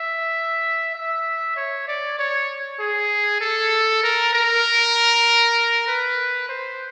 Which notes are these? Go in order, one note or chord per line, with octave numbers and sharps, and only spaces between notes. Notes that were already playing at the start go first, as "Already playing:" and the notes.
Already playing: E5
E5
C#5
D5
C#5
G#4
A4
A#4
A#4
B4
C5